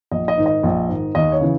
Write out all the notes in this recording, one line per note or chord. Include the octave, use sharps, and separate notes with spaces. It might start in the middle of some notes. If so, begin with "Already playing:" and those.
A#1 D#5
D#5
G#2 D#3
D#5
A#1
G#2 D#3
D#2 D#5
C#5
C#3 E3